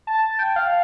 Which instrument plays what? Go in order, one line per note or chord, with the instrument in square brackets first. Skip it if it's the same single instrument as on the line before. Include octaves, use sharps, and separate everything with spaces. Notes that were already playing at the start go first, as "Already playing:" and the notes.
[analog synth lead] A5
G5
F5